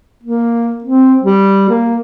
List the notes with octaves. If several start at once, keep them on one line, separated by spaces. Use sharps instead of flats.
A#3
C4
G3
A#3